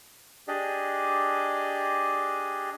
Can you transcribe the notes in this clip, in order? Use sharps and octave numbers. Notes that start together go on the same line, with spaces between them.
D4 G4 G#4 D5 D#5